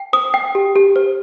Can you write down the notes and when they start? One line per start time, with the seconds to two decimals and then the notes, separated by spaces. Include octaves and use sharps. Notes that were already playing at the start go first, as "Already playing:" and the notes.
Already playing: G5
0.13 C5 D#6
0.34 G5
0.55 G4
0.76 G4
0.96 C5